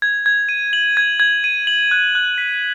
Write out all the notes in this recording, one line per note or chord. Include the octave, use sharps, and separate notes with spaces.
G#6
G#6
D#7
F#7
G#6
G#6
D#7
F#7
F#6
F#6
B6